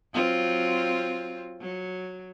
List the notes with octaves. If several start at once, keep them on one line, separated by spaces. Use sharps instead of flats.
F#3 C4 F4
F#3